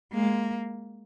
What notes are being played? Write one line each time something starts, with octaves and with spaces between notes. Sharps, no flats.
G#3 A#3